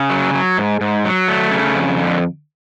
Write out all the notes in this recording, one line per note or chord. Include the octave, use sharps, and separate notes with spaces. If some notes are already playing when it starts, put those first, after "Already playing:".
Already playing: C#3
F#3
F#3
G#2
G#2
F#3
A3
C#3
F2
D3